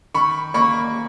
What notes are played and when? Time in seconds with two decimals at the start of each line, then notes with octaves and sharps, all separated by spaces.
0.14 D#3 B5 C#6
0.54 A#3 B5 C#6